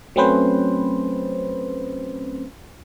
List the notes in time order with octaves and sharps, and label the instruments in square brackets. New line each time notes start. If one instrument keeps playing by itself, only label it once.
[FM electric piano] F#3 A3 C4 C#4 B4 C5